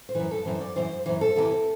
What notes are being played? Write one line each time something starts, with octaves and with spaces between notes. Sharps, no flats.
C5
F#2 E3 B4
A4
F#2 E3 C5
D5
F#2 E3 C5
F#2 E3 C5
A4
E2 C3 E3